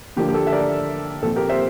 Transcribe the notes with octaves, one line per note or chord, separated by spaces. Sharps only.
D3 F3 A#3 D4 G4
G4
A4
E5
A#4 D5
A#2 F3 C4 A4
G4 A#4
C5 E5